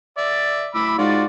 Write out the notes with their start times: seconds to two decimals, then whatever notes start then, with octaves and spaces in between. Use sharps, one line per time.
0.18 D5 E5
0.74 A2 B5 D6 E6
0.98 G#2 F4 F#4 D5